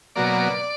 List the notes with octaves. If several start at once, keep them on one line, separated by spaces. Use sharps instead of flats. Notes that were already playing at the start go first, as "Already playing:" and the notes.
B2 F#3 A#3 D5